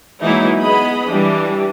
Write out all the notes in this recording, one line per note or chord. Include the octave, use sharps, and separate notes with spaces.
E3 F#3 G#3 A#3 D#4 E4
B3 G#4 D#5 B5
E3 G3 D4 G4